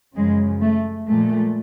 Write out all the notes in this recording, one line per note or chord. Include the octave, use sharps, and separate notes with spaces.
F#2 C#3 F3 G#3
A3
A#2 F3 G#3 A3